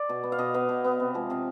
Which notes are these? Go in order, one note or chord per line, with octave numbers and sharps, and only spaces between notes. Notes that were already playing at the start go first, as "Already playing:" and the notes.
Already playing: D5
B2
B3
F5
B2 D#5
B3 F5
B2
B3
C3
F3 G#3
C3 F5